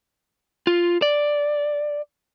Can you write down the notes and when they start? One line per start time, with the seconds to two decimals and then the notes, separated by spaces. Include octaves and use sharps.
0.67 F4
1.02 D5